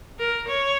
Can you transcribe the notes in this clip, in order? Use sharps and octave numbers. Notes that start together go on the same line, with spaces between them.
A#4
C#5